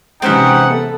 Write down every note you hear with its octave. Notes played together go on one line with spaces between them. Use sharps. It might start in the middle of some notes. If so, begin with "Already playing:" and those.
C3 E3 G#3 C4 C#4 D#4 G4 F#5
B3 A4